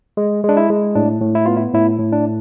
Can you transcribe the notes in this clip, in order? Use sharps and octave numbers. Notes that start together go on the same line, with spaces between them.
G#3
G#3
D4
E4
G#3
A2 D4
A2
E4
B3 F4
E4
A2 E4
A2
D4